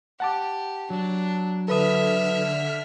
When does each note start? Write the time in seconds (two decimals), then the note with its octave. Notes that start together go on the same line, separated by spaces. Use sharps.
0.20 G4 F#5 A5 D6
0.90 F#3 D4
1.68 D3 A4 B4 E5 D#6 F6 B6